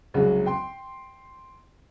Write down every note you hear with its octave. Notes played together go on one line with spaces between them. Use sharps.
C2 C#3 F#3 G#3
G5 C6